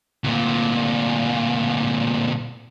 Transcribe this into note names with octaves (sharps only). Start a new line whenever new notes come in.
D2 A#2